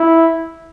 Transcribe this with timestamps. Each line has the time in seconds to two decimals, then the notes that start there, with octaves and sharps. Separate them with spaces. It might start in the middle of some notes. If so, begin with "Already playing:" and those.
Already playing: E4